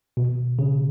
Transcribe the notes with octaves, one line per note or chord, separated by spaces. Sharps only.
B2
C#3